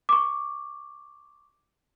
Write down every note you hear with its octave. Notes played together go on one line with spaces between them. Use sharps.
C#6 D6